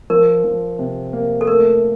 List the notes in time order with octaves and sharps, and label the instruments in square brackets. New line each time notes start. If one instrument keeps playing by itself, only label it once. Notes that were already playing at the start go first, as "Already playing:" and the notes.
[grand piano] F3 [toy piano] A#4
[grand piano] F3
C3
A#3
[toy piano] A4
[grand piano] A3 [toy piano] A#4